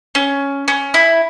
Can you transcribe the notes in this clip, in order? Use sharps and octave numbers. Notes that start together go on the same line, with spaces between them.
C#4
C#4
E4